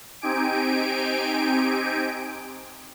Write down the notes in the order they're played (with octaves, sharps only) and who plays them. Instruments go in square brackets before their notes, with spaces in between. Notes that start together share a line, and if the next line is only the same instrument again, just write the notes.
[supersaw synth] C4 D#4 G4 G#5 D7